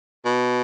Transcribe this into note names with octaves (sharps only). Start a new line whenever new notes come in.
B2